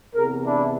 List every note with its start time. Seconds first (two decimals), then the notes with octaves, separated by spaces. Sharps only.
0.14 E2 C3 E3 G#4 A#4
0.45 D4 E4